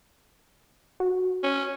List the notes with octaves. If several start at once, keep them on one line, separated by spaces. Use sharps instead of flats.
F#4
C#4